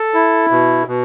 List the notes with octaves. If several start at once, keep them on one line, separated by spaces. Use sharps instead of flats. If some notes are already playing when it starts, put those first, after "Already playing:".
Already playing: A4
E4
B2
B2